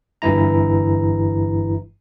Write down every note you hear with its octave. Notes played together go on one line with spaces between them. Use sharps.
G1 G2 E3 E4 A#5